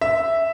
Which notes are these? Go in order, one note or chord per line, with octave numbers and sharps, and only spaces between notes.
E5